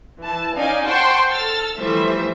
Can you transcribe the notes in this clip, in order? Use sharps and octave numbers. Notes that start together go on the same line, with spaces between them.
E3 A5
C#4 D#4 D5 F5 G#5
C5 F#5 G5 A5 C6 C#6
A4 E6 F6 A6
E3 F3 G3 A3 C5 E5